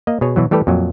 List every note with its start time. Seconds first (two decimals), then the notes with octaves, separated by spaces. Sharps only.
0.07 A#3 D#5
0.21 B2 G#4 C#5
0.36 B2 E3 F#3
0.51 E3 G3 A3 G4 A4 B4
0.67 F2 A#2 F#3